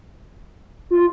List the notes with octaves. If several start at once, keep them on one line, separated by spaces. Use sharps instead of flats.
F4